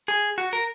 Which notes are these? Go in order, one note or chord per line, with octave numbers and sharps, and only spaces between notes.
G#4
F#4
A#4